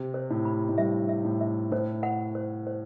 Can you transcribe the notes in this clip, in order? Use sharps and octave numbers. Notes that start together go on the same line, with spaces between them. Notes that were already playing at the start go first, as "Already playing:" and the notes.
Already playing: C3
C5
A2
B5
A2
G2 E5
E5
A2
E5
A2 C5
F#5
C5
C5